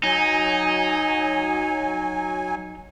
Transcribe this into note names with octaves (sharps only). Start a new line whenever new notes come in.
F#3 D#4 G#5